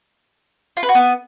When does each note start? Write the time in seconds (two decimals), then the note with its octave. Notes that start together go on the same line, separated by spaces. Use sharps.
0.77 F4
0.83 B4
0.89 F#4
0.95 B3